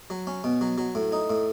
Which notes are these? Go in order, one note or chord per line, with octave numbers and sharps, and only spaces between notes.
F#3
C#4
B2
F#3
F#3
A2
D#4
A2